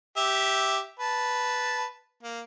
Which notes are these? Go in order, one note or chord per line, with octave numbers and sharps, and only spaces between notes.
G4 E5
B4 A5
A#3